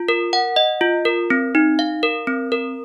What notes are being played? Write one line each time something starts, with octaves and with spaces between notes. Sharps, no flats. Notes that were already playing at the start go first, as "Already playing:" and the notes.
Already playing: F4
A#4
F#5
D#5
F4
A#4
C4
D#4
F5
A#4
C4
A#4